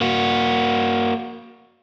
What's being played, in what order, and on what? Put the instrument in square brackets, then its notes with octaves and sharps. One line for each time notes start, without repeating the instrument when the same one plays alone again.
[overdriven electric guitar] A#3 F#4